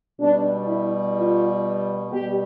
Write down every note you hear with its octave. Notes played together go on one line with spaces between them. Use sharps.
B2 G3 D4
E4
F4
B2 G3 G4